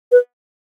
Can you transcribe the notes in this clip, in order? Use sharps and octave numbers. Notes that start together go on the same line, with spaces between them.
B4